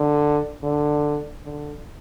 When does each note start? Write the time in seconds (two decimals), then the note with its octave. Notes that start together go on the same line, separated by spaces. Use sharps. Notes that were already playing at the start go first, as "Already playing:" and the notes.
Already playing: D3
0.63 D3
1.44 D3